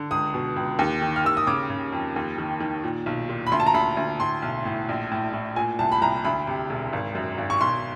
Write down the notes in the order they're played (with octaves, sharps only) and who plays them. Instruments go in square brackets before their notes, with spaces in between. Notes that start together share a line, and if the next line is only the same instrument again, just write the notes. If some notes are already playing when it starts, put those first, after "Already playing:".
Already playing: [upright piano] D3
C#2 D#6
B2
C#2
D#2
D#3
F6
D#2 E6
D#6
C#3 D6
C#3
F2
D#2
D#3
D#3
A#2
B1
A#2
B5
D2 C6
A5
A#5
D2 B5
D2
A2 C6
B1
A2
A#1
A2
A2
A#2 G#5
C2 A5
B5
C2 A#5
D2 B5
C3
E1
G#1
F#2
G#1
C#6
B1 C6